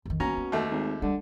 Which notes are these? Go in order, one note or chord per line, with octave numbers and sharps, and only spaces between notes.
F2 D#3
B2 A#3 C#4 A#5
A#3
D#2 A3
G#1
D3 G3